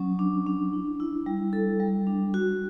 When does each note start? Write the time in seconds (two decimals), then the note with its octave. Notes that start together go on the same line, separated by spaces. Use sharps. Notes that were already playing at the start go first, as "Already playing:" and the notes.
Already playing: F#3 C#4
0.19 D4
0.47 D4
0.73 E4
1.00 E4
1.26 G3
1.53 A4
1.80 G3
2.07 D4
2.34 F#4